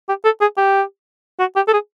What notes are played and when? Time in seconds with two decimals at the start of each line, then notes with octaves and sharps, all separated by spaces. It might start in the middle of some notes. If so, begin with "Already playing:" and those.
0.08 G4
0.24 A4
0.41 G#4
0.57 G4
1.40 F#4
1.56 G4
1.67 A4
1.73 G#4